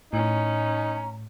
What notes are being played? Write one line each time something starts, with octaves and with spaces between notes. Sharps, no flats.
A2 C#4 D#4 A#5